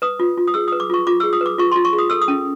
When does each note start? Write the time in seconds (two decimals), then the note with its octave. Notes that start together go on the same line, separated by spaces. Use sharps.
0.02 B4 D#6
0.20 F4
0.37 F4
0.48 D#6
0.54 G#4 E6
0.68 D#6
0.72 B4
0.80 D6
0.90 F4 C#6
1.07 F4 D6
1.20 E6
1.23 G#4
1.33 D#6
1.41 B4 D6
1.58 F4 C#6
1.72 C6
1.76 F4
1.85 C#6
1.93 G#4
1.99 D#6
2.10 A4 E6
2.22 D#6
2.28 C#4